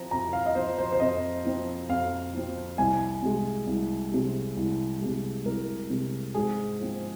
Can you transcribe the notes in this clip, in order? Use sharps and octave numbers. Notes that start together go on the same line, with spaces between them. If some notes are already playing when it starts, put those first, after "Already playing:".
Already playing: F3 C4 A#5
F2 A#5
F5
D#5
F3 C4 C5
C5
C5
F2 D#5
F3 C4
F2 F5
F3 C4
C2 G#5
C3 G#3
C2
C3 G#3
C2
C3 G#3
C2 A#4
C3 G#3
G#2 G#4
F3 C4